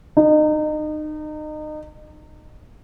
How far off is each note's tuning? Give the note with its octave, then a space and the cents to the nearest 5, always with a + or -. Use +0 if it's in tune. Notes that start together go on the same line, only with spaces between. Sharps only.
D#4 -30